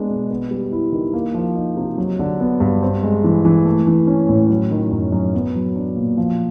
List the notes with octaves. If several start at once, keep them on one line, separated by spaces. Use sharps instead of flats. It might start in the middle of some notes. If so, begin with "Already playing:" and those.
Already playing: G#3 B3 D4
B2
B3
G3
E4
D#3
A#3
F3
D#4
C3
F#3
D3
B3
G2
C4
G#3
E3
E3
A3
E3
C#4
A2
F#3
D#3
F#2
F#2
B3
F#3
D4
A#2
F3